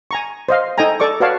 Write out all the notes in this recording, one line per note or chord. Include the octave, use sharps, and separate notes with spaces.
G#5 A#5 C#6
C5 D#5 F5
D#4 A4 D#5 G5 G#5 A#5
A4 D5 C#6 D6
F#4 B4 C#5 D5 F5 A5